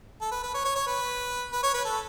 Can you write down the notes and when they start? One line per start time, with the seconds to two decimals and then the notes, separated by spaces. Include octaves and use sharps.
0.21 A4
0.32 B4
0.43 B4
0.54 C#5
0.64 C#5
0.76 C#5
0.87 B4
1.52 B4
1.63 C#5
1.74 B4
1.85 A4